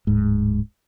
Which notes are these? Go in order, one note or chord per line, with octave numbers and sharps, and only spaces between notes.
D1 G#2